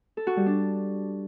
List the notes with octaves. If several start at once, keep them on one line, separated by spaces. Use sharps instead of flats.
A4
F#4
G3
D4